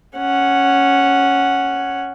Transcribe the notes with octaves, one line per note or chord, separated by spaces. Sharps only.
C#4 F#5